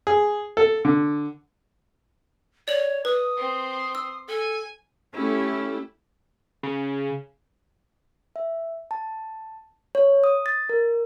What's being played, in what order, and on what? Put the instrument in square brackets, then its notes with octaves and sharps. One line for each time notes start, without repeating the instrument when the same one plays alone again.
[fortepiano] G#4
A4
D3
[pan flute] C#5 [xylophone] D5 F#7
[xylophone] B4 [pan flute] D#6
[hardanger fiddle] C4 C6
[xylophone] E6
[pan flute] A4 [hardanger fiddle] G#5
[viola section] A3 E4 G4 [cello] C#4
[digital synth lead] C#3
[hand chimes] E5
A5
C#5
D#6
A6
A#4